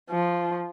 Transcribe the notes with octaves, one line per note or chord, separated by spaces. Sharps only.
F3